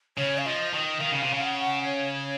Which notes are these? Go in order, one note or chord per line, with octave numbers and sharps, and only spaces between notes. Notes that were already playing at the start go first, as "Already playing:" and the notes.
C#3 C#5
F5
F3 D#5
D#3 D#5
D#3 F5
C#3
C3
C#3
F#5
C#5